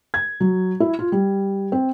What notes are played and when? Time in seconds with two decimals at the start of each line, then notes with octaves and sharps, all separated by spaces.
0.14 G#6
0.40 F#3
0.80 E4
0.99 F4
1.12 G3
1.72 C4